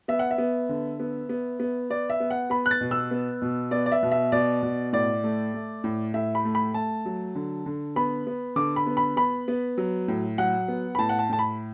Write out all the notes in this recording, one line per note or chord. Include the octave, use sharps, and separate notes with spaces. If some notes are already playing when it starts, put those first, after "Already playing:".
B3 E5
F#5
E5
B3
D3
B3
B3
B3
B3 D5
E5
B3
F#5
B3 B5
F#6
A6
B2
E6
B3
B2
B3 D5
D5
E5
B2
E5
B2 D5
B2
A2 D5
A3
A3
A2
A2 E5
B5
A3
B5
A3 A5
F#3
D3
D3
B3 B5
B3
D3 D6
B5
B3
B5
B3 B5
B3
F#3
A2
F#3 F#5
B3
B5
A2 A5
F#5
A5
A2 A5
B5